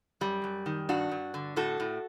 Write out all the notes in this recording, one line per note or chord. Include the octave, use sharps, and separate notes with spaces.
F#2 G3
F#2
D#3
G2 D4 F#4
G2
D3
A2 F#4 A4
A2